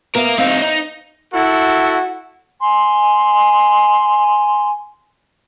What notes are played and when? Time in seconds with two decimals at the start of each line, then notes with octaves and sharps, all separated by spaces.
0.15 B3 A#4 E5 F5
0.38 C4 D#4 C5 F5
0.62 D#4
1.33 E4 F#4 A4 F#5
2.61 G#5 C6